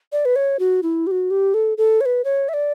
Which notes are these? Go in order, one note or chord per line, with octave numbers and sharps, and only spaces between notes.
D5
B4
C#5
F#4
E4
G4
F#4
G4
A4
A4
C#5
B4
C#5
E5
D5